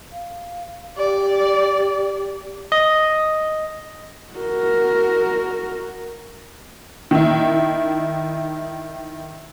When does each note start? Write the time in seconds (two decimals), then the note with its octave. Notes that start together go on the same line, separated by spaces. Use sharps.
0.12 F5
0.97 G4 D5
2.72 D#5
4.34 F#4 A#4
7.11 D#3 E4